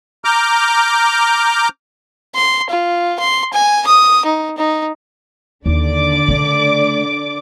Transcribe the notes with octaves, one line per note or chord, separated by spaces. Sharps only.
A#5 D6 F6 G6
C6
F4
C6
G#5
D#6
D#4
D#4
D#2 D3 D#4 D5 D6
C#3 A3